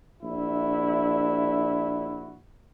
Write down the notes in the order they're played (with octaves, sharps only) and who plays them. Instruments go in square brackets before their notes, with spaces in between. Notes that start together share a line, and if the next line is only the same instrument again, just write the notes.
[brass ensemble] A#1 D4 E4 F#4 E5